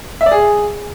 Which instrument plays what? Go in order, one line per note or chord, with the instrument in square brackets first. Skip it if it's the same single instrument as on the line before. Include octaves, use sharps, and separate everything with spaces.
[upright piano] E5
D5
G#4